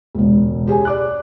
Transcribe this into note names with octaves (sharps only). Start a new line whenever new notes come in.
E1 C#2
G4 G#4 C#5 G#5
D5 D6 F#6